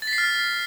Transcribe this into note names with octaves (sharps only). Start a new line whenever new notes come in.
A6
B6
C7
F6